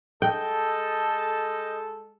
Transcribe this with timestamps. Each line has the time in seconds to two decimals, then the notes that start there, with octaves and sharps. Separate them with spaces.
0.22 G#3 A4 D#5 G5 G6